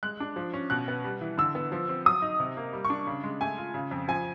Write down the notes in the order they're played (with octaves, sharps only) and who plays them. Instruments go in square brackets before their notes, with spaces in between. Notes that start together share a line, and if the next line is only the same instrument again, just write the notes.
[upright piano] G#3 F#6
D4
F3
C#4
B2 F#6
B3
G3
E3
D3 E6
B3
F3
C4
F#3 D#6
D#4
C3
A#3
G3
C#6
D4
C#3
G#3
A3 G#5
F4
C#3
F2
F3 G#5